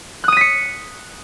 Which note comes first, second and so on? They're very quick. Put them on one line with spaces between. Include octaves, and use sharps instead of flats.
F#6 D#6 D#7 B6 C#7